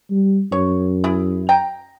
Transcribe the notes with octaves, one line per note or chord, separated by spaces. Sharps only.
G3
F#2 C#5
E4 G#4
G5 A#5